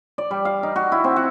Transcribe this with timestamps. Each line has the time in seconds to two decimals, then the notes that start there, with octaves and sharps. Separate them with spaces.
0.18 D5
0.31 G3
0.45 F5
0.63 D#4
0.76 F#4
0.92 E4
1.04 C4
1.16 F#4